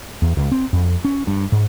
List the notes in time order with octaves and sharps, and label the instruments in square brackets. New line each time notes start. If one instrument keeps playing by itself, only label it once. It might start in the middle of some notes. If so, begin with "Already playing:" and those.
[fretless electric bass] E2
C#2
C4
F2
C#4
G2
G#2